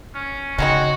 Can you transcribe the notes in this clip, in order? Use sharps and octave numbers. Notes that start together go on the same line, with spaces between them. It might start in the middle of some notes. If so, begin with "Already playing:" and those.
C#4
C#3 G#3 C4 D#4 F#4 C#5